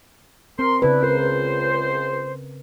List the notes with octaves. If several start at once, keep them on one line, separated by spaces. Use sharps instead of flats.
C4 A#4 C6
C#3 D4 E4 B4
C#2 A#4 C5